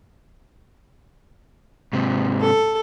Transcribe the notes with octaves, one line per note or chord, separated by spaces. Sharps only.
G#2 C3
A4